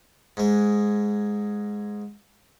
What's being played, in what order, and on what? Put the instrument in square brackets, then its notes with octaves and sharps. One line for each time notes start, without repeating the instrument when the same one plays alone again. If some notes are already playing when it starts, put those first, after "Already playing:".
[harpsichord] G#2 G#3